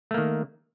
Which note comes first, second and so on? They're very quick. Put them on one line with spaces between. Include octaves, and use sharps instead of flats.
A3 A#3 D#3